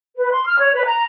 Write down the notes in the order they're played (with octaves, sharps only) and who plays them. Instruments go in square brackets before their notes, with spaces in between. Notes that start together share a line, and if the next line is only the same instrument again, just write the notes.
[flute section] B4
C6
F6
C#5
B4
A#5